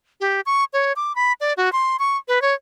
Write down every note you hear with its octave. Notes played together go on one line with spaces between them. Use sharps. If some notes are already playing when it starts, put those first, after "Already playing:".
G4
C#6
C#5
D6
B5
D5
F#4
C6
C#6
B4
C#5